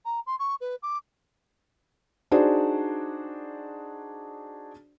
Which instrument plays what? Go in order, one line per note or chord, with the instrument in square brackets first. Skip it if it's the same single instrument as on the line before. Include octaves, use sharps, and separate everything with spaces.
[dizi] A#5
C6
C#6
B4
D6
[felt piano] D4 D#4 F#4 G#4 C5 D5